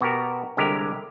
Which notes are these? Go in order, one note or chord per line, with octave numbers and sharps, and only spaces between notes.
B2 F#4 G4 A#4
C2 D3 G#3 G4 A#4